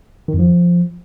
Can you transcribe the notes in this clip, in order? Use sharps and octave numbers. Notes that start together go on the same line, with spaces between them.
D#3
F2
F3